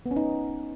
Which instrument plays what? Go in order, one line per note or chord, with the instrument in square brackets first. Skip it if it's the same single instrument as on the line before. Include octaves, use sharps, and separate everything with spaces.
[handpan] B3
C#4
D#4